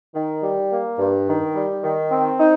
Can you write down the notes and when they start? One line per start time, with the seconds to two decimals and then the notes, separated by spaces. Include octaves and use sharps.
0.15 D#3
0.43 G3
0.72 A#3
0.99 G2
1.28 D#3
1.55 G3
1.83 D#3
2.11 C4
2.39 D#4